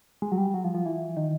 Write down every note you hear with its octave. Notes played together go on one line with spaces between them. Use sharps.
G#3
F#3
G3
F#3
F3
F3
E3
D#3